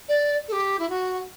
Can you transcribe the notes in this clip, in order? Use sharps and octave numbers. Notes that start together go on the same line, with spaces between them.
D5
A4
G4
E4
F#4